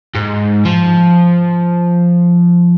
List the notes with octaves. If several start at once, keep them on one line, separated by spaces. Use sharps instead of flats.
G#2
F3